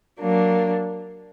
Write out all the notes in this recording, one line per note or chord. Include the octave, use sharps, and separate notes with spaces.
F#3 A#3 D4